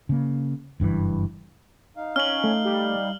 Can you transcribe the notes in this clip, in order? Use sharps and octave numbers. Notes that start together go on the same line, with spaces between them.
C#3 A#3
F#1 G2 B2 E3
D#4 F5
C#4 F6 F#7
A3
G3